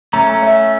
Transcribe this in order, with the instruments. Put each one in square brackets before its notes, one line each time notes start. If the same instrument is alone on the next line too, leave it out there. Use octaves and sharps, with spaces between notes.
[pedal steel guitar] A3 C#4 [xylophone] A#5
[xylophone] E5